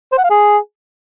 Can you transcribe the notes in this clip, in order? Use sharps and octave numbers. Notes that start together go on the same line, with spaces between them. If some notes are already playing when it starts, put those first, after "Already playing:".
C5
F#5
F5
G#4